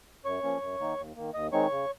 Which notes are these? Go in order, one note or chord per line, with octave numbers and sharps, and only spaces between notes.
F#2 C#5 C#6
F3 A#3 C#4
F#2
D#3 A#3 D#4
D#2
D#3 A#3
D#2 D#5 D#6
D#3 G#3 C4 D#4 C#5 C#6
C#3